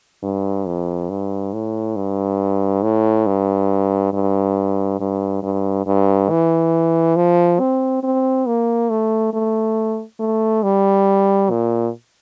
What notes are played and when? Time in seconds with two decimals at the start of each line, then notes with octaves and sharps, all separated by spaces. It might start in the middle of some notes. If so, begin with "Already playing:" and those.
0.23 G2
0.66 F2
1.10 G2
1.53 A2
1.96 G2
2.83 A2
3.27 G2
4.13 G2
5.00 G2
5.43 G2
5.86 G2
6.30 E3
7.17 F3
7.60 C4
8.03 C4
8.46 A#3
8.90 A3
9.33 A3
10.20 A3
10.63 G3
11.50 A#2